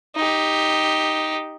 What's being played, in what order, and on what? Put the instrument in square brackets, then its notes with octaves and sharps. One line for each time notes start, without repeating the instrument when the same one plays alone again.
[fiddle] D#4 G4